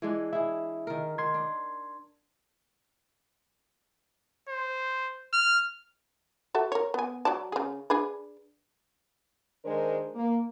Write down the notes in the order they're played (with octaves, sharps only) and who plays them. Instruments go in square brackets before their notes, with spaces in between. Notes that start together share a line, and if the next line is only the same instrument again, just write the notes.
[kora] E3 G#3 D4
[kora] E4 G#4 [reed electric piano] E5
[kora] D#3 A#4
[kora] D#3 [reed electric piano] C6 G#6
[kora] D4
[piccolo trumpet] C5
F6
[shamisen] F#4 A4 E5
A#4 C#5
B3 G#5
F#3 D5 A5
C#3 G#4
D4 G#4 B4
[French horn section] D#3 G#3 D4 A#4 C5
A#3